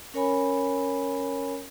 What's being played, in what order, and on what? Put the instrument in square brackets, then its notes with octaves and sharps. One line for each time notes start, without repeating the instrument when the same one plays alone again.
[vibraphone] C#4 A#4 C#5 G#5 B5